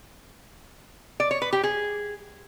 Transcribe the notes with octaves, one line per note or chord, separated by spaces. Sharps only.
D5
C#5
B4
G4
G#4